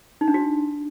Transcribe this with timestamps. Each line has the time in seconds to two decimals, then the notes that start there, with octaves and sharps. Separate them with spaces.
0.21 D#4
0.28 D4
0.34 F#4